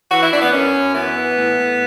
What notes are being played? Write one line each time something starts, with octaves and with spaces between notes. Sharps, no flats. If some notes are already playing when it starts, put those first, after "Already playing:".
E3 F#4
E4
E3 D4
B3
F#2 C#4
F#2
E3 B3
E3
A2
A2